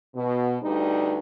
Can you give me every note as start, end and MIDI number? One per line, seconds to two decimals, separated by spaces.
0.15 0.56 47
0.62 1.17 38
0.62 1.17 55
0.62 1.17 63
0.62 1.17 71